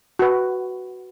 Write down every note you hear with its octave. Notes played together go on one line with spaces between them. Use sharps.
F#4 B4